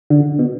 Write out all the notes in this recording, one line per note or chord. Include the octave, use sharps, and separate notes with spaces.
D3
B2